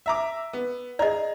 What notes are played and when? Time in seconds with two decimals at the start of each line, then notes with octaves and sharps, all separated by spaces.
0.06 E5 A#5 D6
0.53 B3
0.99 G#4 D5 D#5 A#5